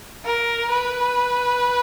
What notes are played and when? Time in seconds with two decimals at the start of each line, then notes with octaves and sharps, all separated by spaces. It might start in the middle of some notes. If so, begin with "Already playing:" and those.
0.25 A#4
0.70 B4